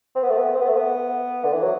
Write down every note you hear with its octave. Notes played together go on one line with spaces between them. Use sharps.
C4
B3
A3
B3
C4
B3
A3
B3
D3
E3
F#3